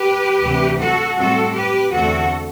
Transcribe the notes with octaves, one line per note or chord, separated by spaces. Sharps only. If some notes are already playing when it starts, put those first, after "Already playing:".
Already playing: G4 B4
D2 C3 E3
F#4 A4
A2 G3 C4 F#4 A4
G4 B4
E2 D3 A3 C4 F#4 A4